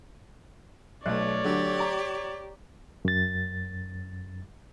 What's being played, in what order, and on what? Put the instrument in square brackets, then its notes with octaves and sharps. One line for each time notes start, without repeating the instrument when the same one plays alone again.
[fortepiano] B1 F#6 [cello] A3 [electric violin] C#5 D5
[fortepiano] D3 F#3 [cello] G4
[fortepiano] A#5
[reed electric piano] F#2 A6